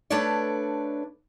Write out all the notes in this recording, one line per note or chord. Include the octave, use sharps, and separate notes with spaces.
A3 D4 A4 B4 C#5 D5